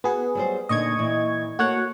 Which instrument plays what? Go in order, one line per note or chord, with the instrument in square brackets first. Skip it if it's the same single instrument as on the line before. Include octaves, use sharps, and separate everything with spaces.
[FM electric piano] B3 G#4 [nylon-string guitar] F#4
[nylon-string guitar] F#3 G3 C5
[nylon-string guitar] A#2 D3 D#4 [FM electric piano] D#5 C#6 G#6
[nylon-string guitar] A#2 E3
[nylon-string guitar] A#3 A4 [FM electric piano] F#4 C#5 F#5